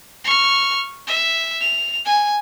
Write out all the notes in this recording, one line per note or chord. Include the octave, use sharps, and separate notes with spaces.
C#6 F6
E5
F7
G#5